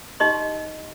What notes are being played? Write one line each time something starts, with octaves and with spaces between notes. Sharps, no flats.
D#4 G4 D#5 C6